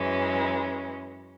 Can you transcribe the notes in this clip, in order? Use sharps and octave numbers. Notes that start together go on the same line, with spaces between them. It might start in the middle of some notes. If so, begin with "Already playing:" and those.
Already playing: F#2 E3 G#3 C#4